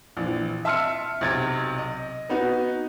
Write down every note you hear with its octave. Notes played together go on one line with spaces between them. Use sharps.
A#1 E3
E5 A5 C6 E6 F6 C#7
B1 C3 G#6 A6
D#5
B3 D#4 F#4 B4